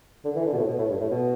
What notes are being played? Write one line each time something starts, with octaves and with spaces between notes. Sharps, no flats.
D3
E3
D3
B2
A2
B2
A2
G2
A2
B2